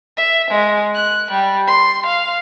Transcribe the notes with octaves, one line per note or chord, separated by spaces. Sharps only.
E5
G#3
F#6
G3
C6
F5